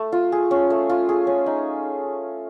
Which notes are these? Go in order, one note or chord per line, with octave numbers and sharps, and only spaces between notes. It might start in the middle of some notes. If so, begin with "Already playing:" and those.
Already playing: A3
F4
G#4
C#4
A3
F4
G#4
C#4
D#4